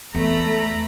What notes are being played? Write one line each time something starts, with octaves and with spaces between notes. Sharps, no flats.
E2 A3 A4 A#5 B5